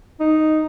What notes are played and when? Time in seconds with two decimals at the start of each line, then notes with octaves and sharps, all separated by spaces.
0.20 D#4